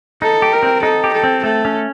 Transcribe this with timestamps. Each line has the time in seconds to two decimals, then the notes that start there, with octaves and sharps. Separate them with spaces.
0.22 D#4 A4
0.42 G4
0.53 A#4
0.63 C4
0.83 D#4 A4
1.04 G4
1.14 A4
1.23 C4
1.43 A3 A4
1.65 C#4